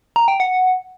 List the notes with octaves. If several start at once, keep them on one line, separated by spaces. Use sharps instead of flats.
A#5
G5
F#5